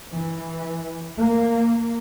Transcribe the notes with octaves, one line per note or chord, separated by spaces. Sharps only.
E3
A#3